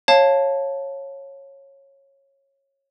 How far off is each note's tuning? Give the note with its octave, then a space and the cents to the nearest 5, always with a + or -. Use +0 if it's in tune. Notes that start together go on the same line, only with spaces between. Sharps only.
C#5 -15 F5 +0 A5 +0